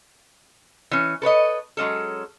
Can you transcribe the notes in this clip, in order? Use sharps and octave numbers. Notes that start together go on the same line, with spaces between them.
E3 C#4
A4 B4 C#5 D#5
F#3 G#3 C#4 A4